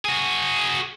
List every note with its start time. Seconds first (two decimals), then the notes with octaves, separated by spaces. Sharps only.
0.05 F#4 G#4